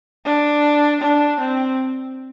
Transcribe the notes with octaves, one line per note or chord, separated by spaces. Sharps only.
D4
D4
C4